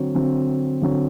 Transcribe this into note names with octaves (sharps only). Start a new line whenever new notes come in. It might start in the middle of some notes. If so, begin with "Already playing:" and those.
Already playing: D3 F#3 C4
D3 F#3 C4
D3 F#3 C4